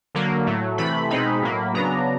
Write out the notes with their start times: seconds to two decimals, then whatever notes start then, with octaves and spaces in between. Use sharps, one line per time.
0.15 D3 F#3 A#3
0.46 A2 F#3 A3
0.78 C3 E3 A3 B5
1.10 B2 G#3 C4 D#4 B5
1.42 A2 F#3 A#3
1.74 C#3 F#3 B3 D4 A#5